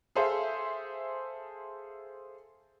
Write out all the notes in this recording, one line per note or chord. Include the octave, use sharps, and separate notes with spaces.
G#4 A4 C5 E5 F5